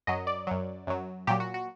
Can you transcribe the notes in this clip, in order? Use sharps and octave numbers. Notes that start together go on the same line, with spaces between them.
F#2 F#3 D#5
D5
F#2 F#3
F#2 F#3
A#2 F#3 G4
F#4
F#4